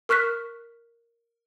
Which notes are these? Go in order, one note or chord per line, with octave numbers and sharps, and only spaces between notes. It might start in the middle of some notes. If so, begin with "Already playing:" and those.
A#4 C#6 F6 F#6 B6